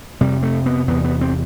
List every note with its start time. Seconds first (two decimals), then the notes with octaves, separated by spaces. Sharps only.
0.21 F2 C3 G3
0.43 A3
0.66 B3
0.88 E2 C3 B3
1.04 B3
1.21 C4